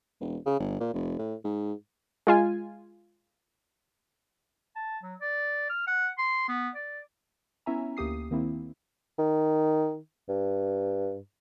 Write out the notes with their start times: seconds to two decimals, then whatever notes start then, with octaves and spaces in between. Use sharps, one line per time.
0.21 E1
0.46 C#3
0.60 G1
0.80 A#2
0.94 F1
1.19 A2
1.44 G#2
2.27 G#3 F4 G#5
4.76 A5
5.03 F#3
5.21 D5
5.70 F6
5.88 F#5
6.18 C6
6.48 B3
6.75 D5
7.66 B3 C#4 E4 E5 G#5 A#5
7.97 D2 A#3 G4 D#6 C7
8.31 D#3 A#3 C4 E4
9.19 D#3
10.29 G2